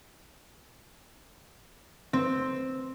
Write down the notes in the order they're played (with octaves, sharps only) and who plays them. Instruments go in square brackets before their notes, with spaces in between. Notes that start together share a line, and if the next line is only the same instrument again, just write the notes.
[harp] C4